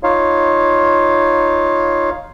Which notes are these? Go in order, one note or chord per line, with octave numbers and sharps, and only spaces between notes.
D#4 F4 C#5 F5